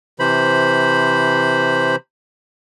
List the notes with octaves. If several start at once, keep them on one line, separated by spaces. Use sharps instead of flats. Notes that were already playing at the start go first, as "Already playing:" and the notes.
C3 E3 C5 B5